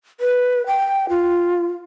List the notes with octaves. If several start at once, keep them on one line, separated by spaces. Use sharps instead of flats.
B4
G5
F4